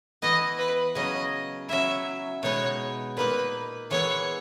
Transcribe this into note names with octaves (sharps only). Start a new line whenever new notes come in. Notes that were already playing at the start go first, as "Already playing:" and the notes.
E3 B3 E4 D#5
B4
C#3 F#3 C#4 D#5
F#3 C#4 E4 E5
B2 G#3 B3 D#4 C#5
A#2 A#3 D#4 B4
E3 G#3 B3 E4 C#5